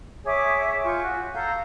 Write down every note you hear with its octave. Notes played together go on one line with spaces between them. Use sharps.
G#4 C#5 E5 D6
F4 G#5 C#6 G6
F#4
A4 F5 A#5 G6